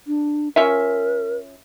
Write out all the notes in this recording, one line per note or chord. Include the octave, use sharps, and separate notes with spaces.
D4
C#4 F4 A#4 E5